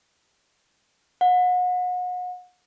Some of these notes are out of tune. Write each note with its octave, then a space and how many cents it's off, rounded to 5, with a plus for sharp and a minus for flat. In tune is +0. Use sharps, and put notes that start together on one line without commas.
F#5 -35